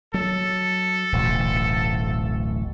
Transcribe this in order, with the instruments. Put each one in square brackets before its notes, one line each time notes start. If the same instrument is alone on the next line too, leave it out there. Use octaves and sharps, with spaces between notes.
[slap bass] F#3 [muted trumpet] A4
[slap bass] D1 A1 B2